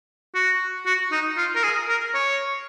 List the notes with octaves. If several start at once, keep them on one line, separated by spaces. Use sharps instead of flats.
F#4
F#4
D#4
F4
A#4
G#4
A#4
C#5